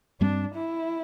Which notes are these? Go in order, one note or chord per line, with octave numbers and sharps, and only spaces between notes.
G2 G3 C4 D4
E4